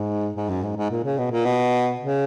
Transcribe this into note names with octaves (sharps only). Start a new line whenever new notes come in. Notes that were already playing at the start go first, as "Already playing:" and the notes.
Already playing: G#2
G#2
F#2
G#2
G#2
A#2
C#3
B2
A#2
B2
C#3